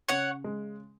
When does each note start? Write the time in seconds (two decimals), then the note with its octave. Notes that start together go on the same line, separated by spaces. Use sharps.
0.09 C#3 C#5 F#5
0.44 G#3